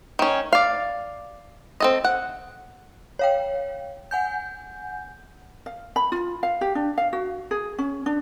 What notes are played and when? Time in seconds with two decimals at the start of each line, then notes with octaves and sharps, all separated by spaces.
0.19 D#3 C#4
0.53 D5 F5
1.80 C4 A4 D#5
2.04 F#5
3.19 C#5 F5 G5
4.11 F#5 G#5 G6
5.66 F5
5.96 B5
6.12 F4
6.43 F5
6.61 G4
6.75 D4
6.97 F5
7.13 F#4
7.51 G#4
7.78 C#4
8.06 D4